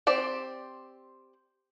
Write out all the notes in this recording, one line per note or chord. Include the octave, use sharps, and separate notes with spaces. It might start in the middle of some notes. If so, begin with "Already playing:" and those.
C4 G4 D5